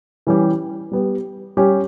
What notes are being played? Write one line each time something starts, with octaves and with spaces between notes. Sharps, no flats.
E3 G3 C#4 G4
G3 B3 G4
G3 C#4 G4